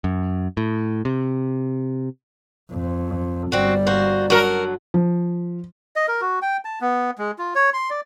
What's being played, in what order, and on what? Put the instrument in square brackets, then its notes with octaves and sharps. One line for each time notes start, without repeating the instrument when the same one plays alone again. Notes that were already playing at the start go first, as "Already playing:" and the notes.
[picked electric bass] F#2
A2
C3
[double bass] F2
[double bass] G1 G3 [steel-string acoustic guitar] C4 F#4 [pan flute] D5
[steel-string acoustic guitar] A#3 F#4 C5
[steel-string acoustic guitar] D3 F#3 [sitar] F#4 A#4
[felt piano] F3
[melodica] D#5
A#4
F#4
G5
A5
B3
G#3
F4
C#5
C6
D5